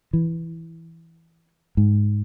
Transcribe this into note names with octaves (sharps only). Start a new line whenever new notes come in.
E3
G#2